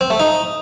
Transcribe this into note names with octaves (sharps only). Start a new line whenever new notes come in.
C4
A3
D#4